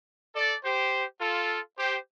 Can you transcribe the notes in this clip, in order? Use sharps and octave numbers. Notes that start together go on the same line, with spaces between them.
A4 D5
G4 C5
F4 A4
G4 C5